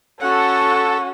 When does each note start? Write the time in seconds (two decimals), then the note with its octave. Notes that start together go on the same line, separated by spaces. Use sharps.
0.20 C#4 F#4 A4 F#5 C#6